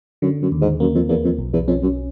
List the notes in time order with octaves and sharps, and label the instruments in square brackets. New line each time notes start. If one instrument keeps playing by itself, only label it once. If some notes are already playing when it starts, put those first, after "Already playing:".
[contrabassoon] F#2 [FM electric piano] D3
[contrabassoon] F#2
[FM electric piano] D#2
[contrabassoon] G#2
[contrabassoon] F#2 [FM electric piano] A#3
[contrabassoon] F2
[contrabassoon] E2 [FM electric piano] A#3
[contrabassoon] F2
[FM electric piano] B1
[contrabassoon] E2
[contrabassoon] F2 [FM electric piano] C#4
[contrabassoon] F#2